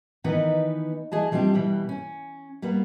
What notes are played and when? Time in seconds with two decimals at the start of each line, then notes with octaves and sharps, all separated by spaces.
0.24 D#3 E3 B3 D#4
1.12 E3 G#4 D#5 A5
1.31 E3 F3 G3 C4 D4 G4
1.54 B2 E3 G3
1.89 C#4
2.62 G3 A#3 B3